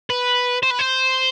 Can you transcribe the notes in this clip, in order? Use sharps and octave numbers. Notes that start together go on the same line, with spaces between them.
B4
C5
B4
C5